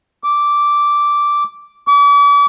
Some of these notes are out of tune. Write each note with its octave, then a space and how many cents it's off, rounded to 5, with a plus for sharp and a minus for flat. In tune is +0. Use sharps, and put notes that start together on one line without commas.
D6 -5
D6 -40